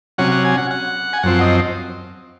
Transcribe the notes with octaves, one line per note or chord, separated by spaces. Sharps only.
C3 F#3 C#4 F#5
F#5
G#5
F#5
F#5
G#5
F#2 F3 C4 F#5
D#5